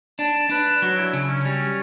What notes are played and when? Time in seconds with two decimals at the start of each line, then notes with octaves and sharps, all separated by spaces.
0.19 D4 A5
0.50 D4 B4
0.82 F#3 F#4
0.97 E4
1.13 C#3
1.29 C#4
1.45 G3